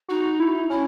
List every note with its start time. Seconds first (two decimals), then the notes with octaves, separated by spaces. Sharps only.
0.08 D#4 F#4
0.40 E4
0.70 C#4 E4